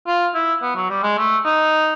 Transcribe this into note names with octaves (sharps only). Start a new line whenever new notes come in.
F4
E4
B3
F#3
G3
G#3
A3
D#4